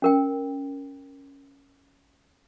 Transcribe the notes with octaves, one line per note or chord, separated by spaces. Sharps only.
C#4 A#4 G5